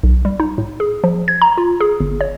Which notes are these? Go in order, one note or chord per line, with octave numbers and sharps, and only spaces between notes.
B1
G3
D#4
A2
G#4
F3
G#6
A#5
F4
G#4
G1
C#5